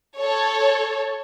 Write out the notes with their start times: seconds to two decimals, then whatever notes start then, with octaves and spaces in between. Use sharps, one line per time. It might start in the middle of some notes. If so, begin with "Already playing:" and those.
0.17 A4 C#5